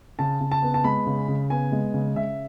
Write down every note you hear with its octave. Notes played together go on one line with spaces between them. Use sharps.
C#3 A5
C#3
A5
B3
A5
G#3 B5
C#3
C#3
B3 G#5
G#3
C#3
C#3 E5